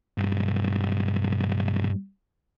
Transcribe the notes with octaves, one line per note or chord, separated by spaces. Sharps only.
B1 G2